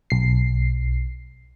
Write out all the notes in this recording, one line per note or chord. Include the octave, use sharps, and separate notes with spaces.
B1 C7